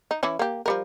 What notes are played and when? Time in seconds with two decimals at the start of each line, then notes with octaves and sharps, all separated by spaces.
0.11 D#4
0.23 E3 C#4 E4
0.39 A#3 G4
0.66 F3 G3 A#4